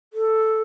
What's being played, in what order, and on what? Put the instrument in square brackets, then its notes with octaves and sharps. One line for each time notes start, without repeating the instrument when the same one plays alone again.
[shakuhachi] A4